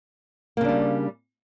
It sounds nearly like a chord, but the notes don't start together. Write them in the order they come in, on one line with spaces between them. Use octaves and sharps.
A#3 C#3 D4 G3